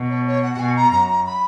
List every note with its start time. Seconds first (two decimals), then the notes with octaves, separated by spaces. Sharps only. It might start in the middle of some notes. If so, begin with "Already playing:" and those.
Already playing: B2
0.10 C#5
0.26 C#5
0.43 F#5
0.54 F#5
0.59 B2 G#5
0.76 A#5
0.92 F#2 A#5
1.09 A#5
1.26 B5